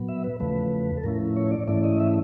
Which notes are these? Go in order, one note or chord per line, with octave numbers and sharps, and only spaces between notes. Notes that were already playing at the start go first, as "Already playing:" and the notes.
Already playing: A#2 F#3 B3
E5
B4
E2 C#3 F3 A3 B4
A4
A2 F3 A3 C#4 E4 A#4
C#5
D5
G#2 E3 A3 C#4 E4 D5
D#5
E5